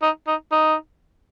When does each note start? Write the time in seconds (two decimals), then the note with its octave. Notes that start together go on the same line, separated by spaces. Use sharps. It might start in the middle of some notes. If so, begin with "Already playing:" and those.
0.02 D#4
0.27 D#4
0.52 D#4